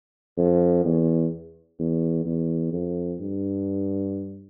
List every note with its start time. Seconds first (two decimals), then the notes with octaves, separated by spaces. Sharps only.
0.38 F2
0.85 E2
1.79 E2
2.26 E2
2.73 F2
3.20 G2